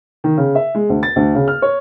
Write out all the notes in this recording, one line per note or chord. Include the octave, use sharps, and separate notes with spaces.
D#3
C#3
E5
G#3
D2
A6
D2
C#3
F6
C#5